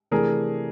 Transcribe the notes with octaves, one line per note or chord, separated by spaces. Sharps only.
C3 E3 A3 D4 G#4 A#4